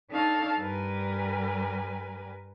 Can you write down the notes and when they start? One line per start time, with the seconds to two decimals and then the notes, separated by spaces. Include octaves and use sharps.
0.11 D4 D#4 A4 C#5 F5 A5
0.60 G2 G3 A#4 B4 G#5